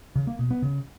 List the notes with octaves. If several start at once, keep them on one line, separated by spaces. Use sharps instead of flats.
C#3
A#3
B2
B3
C#3